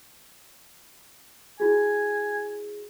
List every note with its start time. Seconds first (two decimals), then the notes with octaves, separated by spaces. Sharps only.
1.60 E4 F#4 G#4 G#5